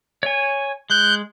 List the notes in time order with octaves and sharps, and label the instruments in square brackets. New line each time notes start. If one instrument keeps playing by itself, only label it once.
[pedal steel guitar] C#5 G#5
[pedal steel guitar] G#3 [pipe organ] F#6 G6